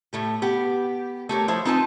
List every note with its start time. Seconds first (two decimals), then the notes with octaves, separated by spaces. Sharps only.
0.13 A2 A3 G4
0.42 B3 G4
1.29 A3 G4 A#4 C#5
1.48 F3 E4 C5
1.65 C4 D#4 F4 B4 G#5 A5